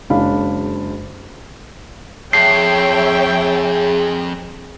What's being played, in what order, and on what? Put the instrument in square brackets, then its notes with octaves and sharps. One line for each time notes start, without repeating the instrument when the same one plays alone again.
[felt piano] F#1 G#3 C#4 D4 F5 B5
[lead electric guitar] F2 [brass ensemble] G#4 [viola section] C#5 E5 G5 [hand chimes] C7